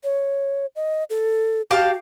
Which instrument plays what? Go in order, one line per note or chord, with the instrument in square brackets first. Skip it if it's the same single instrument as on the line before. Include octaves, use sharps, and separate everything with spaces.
[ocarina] C#5
D#5
A4
[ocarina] F#4 [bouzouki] G4 F5 A5